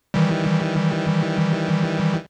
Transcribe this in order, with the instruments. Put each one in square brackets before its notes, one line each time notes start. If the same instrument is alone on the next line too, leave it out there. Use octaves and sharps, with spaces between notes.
[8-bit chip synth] D#3 E3 G3